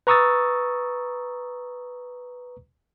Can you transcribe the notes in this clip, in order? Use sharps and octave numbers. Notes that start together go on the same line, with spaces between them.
B4 A#5 C#6 D#6 E6 A6